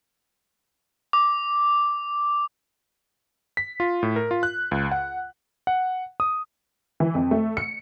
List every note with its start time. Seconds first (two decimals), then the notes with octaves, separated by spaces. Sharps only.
1.13 D6
3.57 B6
3.80 F4
4.03 A2
4.16 A#4
4.31 F4
4.43 F#6
4.71 C#2
4.92 F#5
5.67 F#5
6.20 D#6
7.00 E3
7.15 F2
7.31 A3
7.57 C#7